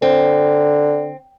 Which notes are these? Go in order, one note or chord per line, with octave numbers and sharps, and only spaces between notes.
D3 C4